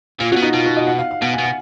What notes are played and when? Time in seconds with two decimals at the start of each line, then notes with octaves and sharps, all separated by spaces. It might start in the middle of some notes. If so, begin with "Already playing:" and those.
0.20 A#2 F4
0.32 C#3 F#4
0.37 B2
0.43 D#4
0.54 B2 F4
0.66 F#4
0.77 D#5
0.87 F#5
0.98 F5
1.11 F5
1.21 B2 F#5
1.33 G#5
1.38 B2
1.44 F#5